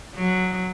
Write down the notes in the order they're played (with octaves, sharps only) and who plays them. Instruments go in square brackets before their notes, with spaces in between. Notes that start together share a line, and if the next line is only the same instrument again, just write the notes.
[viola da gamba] F#3